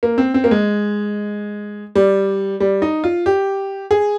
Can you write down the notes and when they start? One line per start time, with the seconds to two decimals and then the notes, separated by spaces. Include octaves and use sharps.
0.03 A#3
0.18 C4
0.34 C4
0.44 A#3
0.51 G#3
1.96 G3
2.60 G3
2.82 D#4
3.04 F4
3.26 G4
3.91 G#4